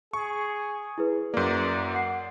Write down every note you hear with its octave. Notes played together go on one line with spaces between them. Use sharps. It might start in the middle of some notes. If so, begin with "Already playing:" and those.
G#4 C#6
E4 G#4 B4
F#2 A#3 D5
F#5 C7